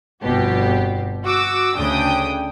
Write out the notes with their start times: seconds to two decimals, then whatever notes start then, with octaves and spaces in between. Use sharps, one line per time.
0.23 G1 F2 B2 G4
1.25 F#4 D6 E6
1.76 D2 C#3 D4 G5 D#6